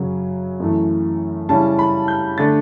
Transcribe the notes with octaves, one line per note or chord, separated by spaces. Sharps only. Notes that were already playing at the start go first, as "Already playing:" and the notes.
Already playing: F#2 C#3 F#3
F#2 E3 A3
C#3 G3 C#4 E4 A5
B5
G6
D3 A3 D4 A6